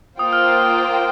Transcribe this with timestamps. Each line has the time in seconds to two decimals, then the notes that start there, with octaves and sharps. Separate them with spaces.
0.19 A#3 F4 C5 G5 D#6
0.33 F6